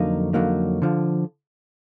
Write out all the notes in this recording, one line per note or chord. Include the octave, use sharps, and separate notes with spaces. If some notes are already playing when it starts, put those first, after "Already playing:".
Already playing: F2 D3 F#3 A#3 D#4
F2 D3 F#3 A#3 D#4
D3 F3